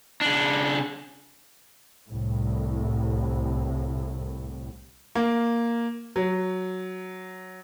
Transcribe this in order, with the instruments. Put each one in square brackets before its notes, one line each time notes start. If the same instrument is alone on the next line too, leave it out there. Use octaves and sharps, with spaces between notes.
[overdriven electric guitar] C#3 D4
[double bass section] C2 A2
[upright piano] A#3
F#3